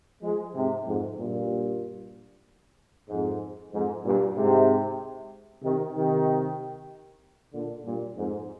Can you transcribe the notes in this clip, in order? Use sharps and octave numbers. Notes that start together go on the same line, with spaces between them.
F3 G#3
G#2 C3
F2 G#2
G2 A#2
F2 G#2
F2 G#2
G2 A#2
G#2 C3
C3 D#3
C3 D#3
A#2 D3
G2 A#2
F2 G#2